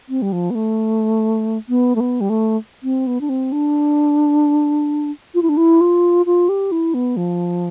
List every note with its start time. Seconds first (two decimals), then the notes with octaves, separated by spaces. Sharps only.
0.09 C4
0.22 G3
0.32 F3
0.50 B3
0.55 A3
1.69 B3
1.96 A3
2.00 B3
2.21 G3
2.29 A3
2.83 C4
3.07 B3
3.21 D4
3.29 C4
3.52 D4
5.34 F4
5.42 E4
5.49 D4
5.57 E4
5.81 F4
6.26 F4
6.49 G4
6.72 E4
6.94 B3
7.17 F3